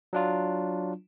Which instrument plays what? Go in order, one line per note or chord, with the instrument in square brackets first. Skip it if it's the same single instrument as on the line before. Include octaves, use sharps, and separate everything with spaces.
[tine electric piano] F#3 D4 F4